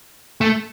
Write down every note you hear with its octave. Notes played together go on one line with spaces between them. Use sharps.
A3